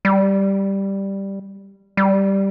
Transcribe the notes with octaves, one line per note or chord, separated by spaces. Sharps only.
G3
G3